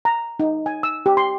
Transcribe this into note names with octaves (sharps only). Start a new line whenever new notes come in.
A#5
D#4
G#5
E6
G4
C6